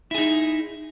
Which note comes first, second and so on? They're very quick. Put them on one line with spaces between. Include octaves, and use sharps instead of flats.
E4 G#4 D#4